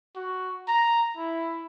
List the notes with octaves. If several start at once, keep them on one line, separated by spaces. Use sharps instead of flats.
F#4
A#5
E4